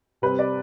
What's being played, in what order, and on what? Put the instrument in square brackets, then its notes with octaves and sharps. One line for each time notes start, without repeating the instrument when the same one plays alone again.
[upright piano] C3 G3 C4 B4
D5